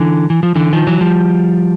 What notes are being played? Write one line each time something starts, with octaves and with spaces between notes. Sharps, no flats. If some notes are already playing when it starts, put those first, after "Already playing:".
Already playing: D3 E3
E3
F3
D3 E3
D#3 F3
E3 F#3
F3 G3